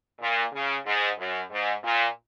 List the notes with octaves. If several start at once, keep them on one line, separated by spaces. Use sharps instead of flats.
A#2
C#3
G#2
F#2
G#2
A#2